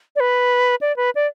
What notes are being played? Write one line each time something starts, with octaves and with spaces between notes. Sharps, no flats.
D5
B4
D5
B4
D5